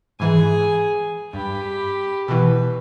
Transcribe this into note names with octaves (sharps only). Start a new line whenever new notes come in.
G#2 E3 G#4 G#5
G2 G4 B5
B2 E3 B4